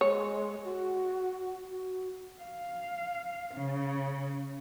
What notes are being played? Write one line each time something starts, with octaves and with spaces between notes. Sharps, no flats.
G#3 C#5
F#4
F#4
F5
C#3